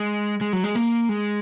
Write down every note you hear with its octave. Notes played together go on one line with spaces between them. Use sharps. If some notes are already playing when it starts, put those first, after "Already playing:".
Already playing: G#3
G#3
F#3
G#3
A#3
G#3